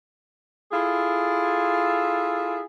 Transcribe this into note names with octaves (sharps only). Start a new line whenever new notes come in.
E4 F4 G#4 A4